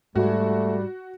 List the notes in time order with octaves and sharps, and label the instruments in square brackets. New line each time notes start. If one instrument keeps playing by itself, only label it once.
[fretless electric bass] G#2 [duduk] G3 [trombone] A3 [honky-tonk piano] F#4